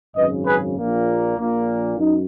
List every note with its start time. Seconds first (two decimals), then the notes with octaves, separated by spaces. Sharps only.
0.15 G#1 F#2 C#3 B4 D#5
0.45 G#4 B4
0.76 A#1 A#2 A#3
1.37 A#1 A#2 A#3
1.97 F#2 D#4